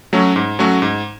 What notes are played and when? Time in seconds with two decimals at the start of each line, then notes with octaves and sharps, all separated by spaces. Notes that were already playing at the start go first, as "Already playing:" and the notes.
0.13 F#3 A3 C#4 F#4
0.36 G#2
0.59 F#3 A3 C#4 F#4
0.82 G#2